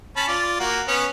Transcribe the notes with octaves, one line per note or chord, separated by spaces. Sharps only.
C#4 A5 B5
F4 D5
A#3 F#4
B3 C#4 C#5